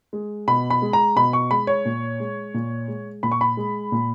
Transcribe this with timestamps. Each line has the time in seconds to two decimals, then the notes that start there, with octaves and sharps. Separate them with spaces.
0.13 G#3
0.48 B2 B5
0.70 B5
0.82 G#3
0.93 A#5
1.16 B2 B5
1.33 C#6
1.51 G#3 B5
1.67 C#5
1.85 A#2
2.20 G#3
2.54 A#2
2.88 G#3
3.23 A#2 B5
3.32 C#6
3.41 B5
3.57 G#3
3.92 A#2